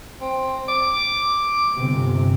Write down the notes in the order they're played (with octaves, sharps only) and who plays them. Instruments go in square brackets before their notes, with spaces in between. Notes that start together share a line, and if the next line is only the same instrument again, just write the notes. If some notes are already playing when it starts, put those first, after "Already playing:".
[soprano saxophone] C4
D6
[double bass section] G1 C3